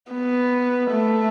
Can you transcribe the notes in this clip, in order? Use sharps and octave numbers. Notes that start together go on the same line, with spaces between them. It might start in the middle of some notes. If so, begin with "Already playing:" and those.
B3
A3